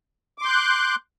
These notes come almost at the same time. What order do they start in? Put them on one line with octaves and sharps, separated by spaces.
D6 C6 G6 F#6